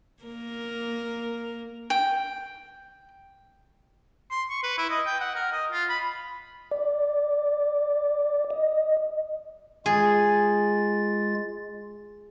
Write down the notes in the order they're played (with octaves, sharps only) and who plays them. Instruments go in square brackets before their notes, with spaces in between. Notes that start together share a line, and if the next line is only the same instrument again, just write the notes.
[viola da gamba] A#3 A#4
[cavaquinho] G5
[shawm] C6
C#6
B4
E4
D#5
G5
F#5
A#4
D#5
F4
B5
[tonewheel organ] D5
D#5
[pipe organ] G#3 F4 A6 [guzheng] G#4